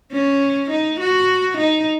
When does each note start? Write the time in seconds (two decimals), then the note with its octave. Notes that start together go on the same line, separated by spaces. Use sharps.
0.12 C#4
0.71 D#4
1.00 F#4
1.58 D#4